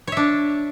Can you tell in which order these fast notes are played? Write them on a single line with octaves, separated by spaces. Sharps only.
C#5 E5 D4